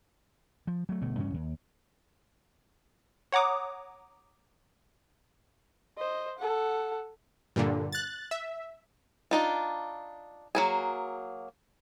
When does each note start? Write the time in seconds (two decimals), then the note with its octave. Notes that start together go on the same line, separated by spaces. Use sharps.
0.67 F3
0.89 F#3 A3
1.01 G1 B2 A3
1.18 A1 G2 C#3 C#4
1.34 D#2
3.32 C#5 F#5 A#5 D6 D#6
5.98 C5 D#5
6.39 A4 F#5
7.56 G2 A#2 D3
7.92 F#6 A6
8.31 E5
9.31 D4 D#4 F4
10.55 F#3 A#3 G#4